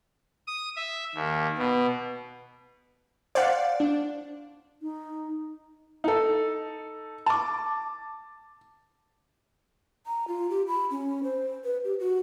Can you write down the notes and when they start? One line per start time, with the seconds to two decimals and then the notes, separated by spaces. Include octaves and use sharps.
0.47 D#6
0.76 E5
1.15 D#2
1.58 B2
3.35 C5 D5 F5 F#5
3.80 D4
4.82 D#4
6.04 D#4 A4
7.26 A5 D6
10.07 A#5
10.28 F4
10.50 G4
10.68 B5
10.91 C#4
11.23 C5
11.64 B4
11.84 G4
12.00 F#4